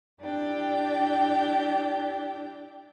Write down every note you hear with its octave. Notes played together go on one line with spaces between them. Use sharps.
D4 E4 G4 G5